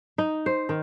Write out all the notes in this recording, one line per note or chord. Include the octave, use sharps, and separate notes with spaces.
D#4
C5
D#3